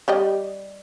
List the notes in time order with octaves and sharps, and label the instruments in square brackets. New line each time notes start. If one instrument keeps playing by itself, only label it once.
[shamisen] G3 G4 D#5